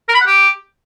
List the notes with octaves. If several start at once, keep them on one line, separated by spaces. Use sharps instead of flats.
A#4
B5
F#5
G4